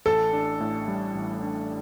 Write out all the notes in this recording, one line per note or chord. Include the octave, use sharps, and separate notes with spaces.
A1 A4
D4
A2
G3
A1
D4